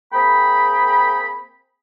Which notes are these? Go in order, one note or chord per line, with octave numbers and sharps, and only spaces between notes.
A#3 C4 G#4 G5 B5